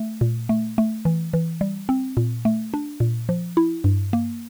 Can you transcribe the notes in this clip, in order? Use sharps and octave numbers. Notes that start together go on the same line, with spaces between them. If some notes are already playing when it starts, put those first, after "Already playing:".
Already playing: A3
A#2
A3
A3
E3
E3
G3
C4
A#2
A3
D4
A#2
F3
E4
G2
A#3